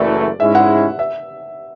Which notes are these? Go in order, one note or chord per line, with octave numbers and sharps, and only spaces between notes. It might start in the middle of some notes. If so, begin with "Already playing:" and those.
Already playing: F#1 F#2 E3 A3 D5
G#2 G#3 C#4 E4 E5
F#5
E5